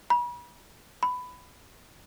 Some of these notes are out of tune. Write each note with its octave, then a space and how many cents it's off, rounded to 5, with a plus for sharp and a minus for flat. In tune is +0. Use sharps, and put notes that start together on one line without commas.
B5 -35
B5 +15